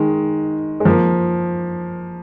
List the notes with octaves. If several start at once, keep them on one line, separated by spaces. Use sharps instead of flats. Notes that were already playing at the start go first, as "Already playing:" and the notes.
Already playing: D#3 G#3
G#3
F3 A#3